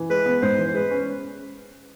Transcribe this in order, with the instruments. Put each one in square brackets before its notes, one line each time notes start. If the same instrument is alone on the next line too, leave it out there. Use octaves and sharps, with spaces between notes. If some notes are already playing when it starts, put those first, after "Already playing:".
Already playing: [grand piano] E3
[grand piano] G#3 [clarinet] B4
[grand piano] B3
[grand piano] G#2 [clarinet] C5
[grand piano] E3
[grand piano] G#3 [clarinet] B4
[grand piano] C#4